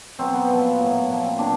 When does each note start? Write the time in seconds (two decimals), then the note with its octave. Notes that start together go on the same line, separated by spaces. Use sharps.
0.19 B2 F#3 C4
0.34 B3
0.49 A#2 F3
0.78 A2 F#3
1.08 A#2 F3
1.24 C4
1.38 B2 F#3 D4